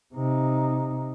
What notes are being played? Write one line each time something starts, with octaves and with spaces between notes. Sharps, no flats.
C3 D#4